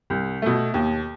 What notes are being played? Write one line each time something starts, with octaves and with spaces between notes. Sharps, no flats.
C2
B2 A3
D#2